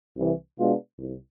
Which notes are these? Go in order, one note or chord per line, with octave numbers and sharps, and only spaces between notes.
C2 C3 E3
B2 G#3 B3 D4 F4
C2